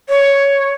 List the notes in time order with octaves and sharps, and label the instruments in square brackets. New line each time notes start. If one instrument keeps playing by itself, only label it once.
[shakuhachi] C#5